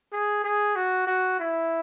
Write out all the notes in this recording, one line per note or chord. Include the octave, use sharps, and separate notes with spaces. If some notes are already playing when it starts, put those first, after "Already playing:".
G#4
G#4
F#4
F#4
E4